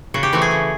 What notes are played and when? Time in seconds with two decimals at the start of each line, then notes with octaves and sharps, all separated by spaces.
0.14 C#3 F#4
0.23 G4
0.33 E3 A3 C4 F#4
0.42 G#4
0.51 C#3